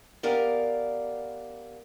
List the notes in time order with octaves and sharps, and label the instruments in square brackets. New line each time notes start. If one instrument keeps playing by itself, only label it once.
[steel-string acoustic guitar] B3 G4 A#4 D5 F5